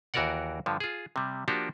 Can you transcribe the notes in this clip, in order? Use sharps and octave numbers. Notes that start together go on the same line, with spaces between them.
D#2 E3 F#4 A#4 D5 F#5
G2 D3 F3
F4 G#4
C3 G3
F3 A#3 D4 F#4 G4